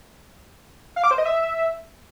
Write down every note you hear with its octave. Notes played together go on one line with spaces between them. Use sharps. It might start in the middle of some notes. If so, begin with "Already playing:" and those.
F5
D6
C5
D#5
E5